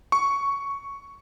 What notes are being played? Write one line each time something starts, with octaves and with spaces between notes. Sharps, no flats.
C#6